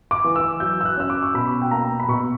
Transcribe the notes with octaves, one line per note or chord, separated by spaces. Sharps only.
D6
E3
E6
F#3 G6
E6
F#6
C#4 E6
D6
C#6
B2 B5
G5
A#3 A#5
B5
B2 C#6